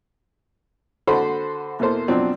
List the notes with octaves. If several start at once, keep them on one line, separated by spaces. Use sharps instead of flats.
D3 F#4 A4 C5 B5
E2 B2 A#3 A4 C5
B2 F3 F#3 C4 D4